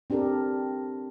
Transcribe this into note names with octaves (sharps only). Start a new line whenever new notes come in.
C4 D4 G4 A4 A#4